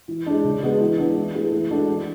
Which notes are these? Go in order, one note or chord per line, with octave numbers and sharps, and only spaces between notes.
E3
G#3 D4
C#3
G#3 B3 F#4 B4
E3
G#3 B3 D4
E3
A3 E4 G#4 B4
E3
G#3 D4 F#4 A4
E3